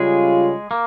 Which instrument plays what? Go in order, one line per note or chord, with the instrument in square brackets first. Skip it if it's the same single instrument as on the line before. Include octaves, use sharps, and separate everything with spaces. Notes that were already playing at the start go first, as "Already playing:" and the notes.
Already playing: [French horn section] C#3 G3 C#4 F4 [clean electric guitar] G#3 G#4
[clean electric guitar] A#3